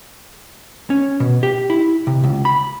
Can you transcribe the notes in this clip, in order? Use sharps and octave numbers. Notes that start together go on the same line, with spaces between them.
C#4
B2
G4
E4
C3
C#2
B5